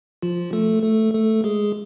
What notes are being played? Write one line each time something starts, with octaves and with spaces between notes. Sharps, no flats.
F3 F4
A3 A4
A3 A4
A3 A4
G#3 G#4